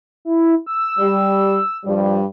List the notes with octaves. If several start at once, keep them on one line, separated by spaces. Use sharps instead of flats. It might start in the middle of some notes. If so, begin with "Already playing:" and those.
E4
E6
G3
G2 F3 G3